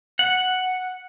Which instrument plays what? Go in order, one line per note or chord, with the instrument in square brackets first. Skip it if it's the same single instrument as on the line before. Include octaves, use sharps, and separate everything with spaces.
[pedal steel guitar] F#5